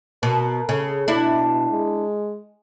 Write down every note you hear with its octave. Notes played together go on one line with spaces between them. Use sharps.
B2 A#4
C#3 A4
B2 D4 E4
G#3